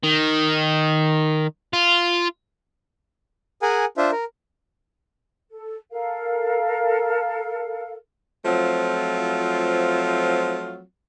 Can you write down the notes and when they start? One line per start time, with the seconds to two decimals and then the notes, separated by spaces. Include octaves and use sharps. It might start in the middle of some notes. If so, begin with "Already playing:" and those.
0.04 D#3
1.73 F4
3.62 G#4 A#4 F#5 G#5
3.98 D4 F4 C5 E5
4.12 A#4
5.49 A4
5.92 A4 A#4 F5
8.45 F3 F#3 A3 C4 F4